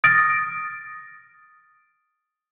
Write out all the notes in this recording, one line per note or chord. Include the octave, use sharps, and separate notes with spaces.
D#6 F6 A6 A#6 D7